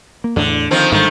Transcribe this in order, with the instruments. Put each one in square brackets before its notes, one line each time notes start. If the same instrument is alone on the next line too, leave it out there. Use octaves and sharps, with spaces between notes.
[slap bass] A#3
[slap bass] E2 A2 [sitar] D3
[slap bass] D3 [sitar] D#3 F3 C4
[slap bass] G1 G#2 G3 [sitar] D#3 A3